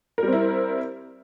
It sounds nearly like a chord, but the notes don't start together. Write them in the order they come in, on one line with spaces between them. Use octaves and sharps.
A#4 G3 C4 E4